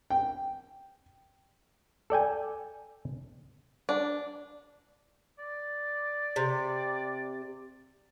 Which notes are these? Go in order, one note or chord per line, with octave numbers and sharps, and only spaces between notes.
G5
A4 D5 G5 G#5
D4
D5
C3